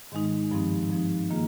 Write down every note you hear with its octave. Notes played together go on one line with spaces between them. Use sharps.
G#2 D#3 G#3 D#4
G2 F3 C4 D#4
G2 F3 C4 D#4
D#3 A#3 F4 G#4